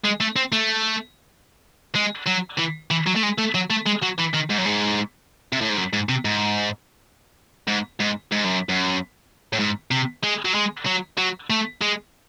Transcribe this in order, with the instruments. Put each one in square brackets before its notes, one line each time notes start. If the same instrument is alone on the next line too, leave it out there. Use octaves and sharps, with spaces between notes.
[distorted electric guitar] G#3
A3
C4
A3
G#3
F#3
E3
E3
F#3
A3
G#3
A3
F#3
A3
G#3
F#3
E3
D#3
G#2
F#2
G#2
C3
A2
G#2
F#2
G#2
C3
G#2
G#2
G#2
G#2
F#2
F#2
A2
G#2
C3
G#3
F#3
G#3
F#3
F#3
A3
G#3